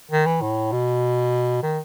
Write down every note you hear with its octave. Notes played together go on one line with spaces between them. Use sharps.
D#3
E3
A2
B2
D#3